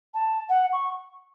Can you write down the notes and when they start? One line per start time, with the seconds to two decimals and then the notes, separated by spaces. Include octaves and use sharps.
0.14 A5
0.49 F#5
0.73 C#6